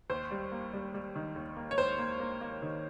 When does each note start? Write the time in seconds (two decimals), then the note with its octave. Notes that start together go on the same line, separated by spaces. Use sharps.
0.10 D#2 C5
0.31 G3
0.52 A#3
0.73 G3
0.94 G3
1.16 D#3
1.36 D#2
1.57 A#3
1.71 C#5
1.78 D#2 C5
1.99 A#3
2.20 A#3
2.41 A#3
2.62 D#3